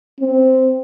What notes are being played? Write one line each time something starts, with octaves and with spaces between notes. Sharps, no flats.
C4